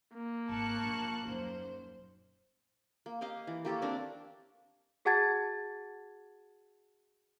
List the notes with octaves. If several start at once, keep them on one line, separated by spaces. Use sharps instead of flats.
A#3
G#1 A5 C#6 F#6
A#1
D#1 F#2 D#4 C5
A#3
A#3 G4 D#5 F5
E3
A#3 G4 A4 C#5
C4 D4 A#4
F#4 G#4 F#5 A5 G#6 A6